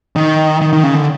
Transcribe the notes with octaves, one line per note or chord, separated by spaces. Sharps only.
D#3
D#3
D#3
C#3
D3